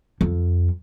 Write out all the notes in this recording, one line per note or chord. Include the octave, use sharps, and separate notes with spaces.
F2